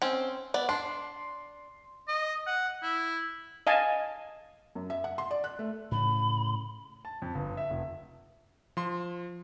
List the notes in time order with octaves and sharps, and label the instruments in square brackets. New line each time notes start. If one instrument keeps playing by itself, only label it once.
[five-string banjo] C4 C#4
B3 D5
[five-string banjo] D4 [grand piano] C6
[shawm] D#5
F#5
E4
[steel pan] D#5 F5 G#5 A5
[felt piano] F#2
E5
F#5
C6
D5
F#6
A3
[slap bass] A2 C#3 [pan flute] B5
[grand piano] A5
F2
G1
E5
F1
[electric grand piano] F3 C6